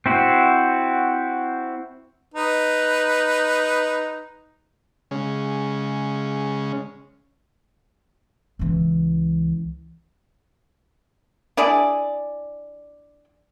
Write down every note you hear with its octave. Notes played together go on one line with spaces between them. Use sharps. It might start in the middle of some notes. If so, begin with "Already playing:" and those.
C4 E4 F#4
D#4 B4
C#3 G#3 C#4
C#2 E3
D4 E4 G#4 D5